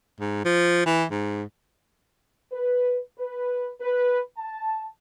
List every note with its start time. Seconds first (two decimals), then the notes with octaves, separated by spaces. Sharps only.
0.20 G#2
0.45 F3
0.86 E3
1.11 G#2
2.52 B4
3.18 B4
3.81 B4
4.38 A5